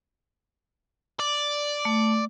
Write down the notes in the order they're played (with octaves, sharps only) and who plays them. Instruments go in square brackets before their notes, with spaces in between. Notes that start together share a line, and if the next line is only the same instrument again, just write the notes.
[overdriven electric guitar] D5
[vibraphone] A3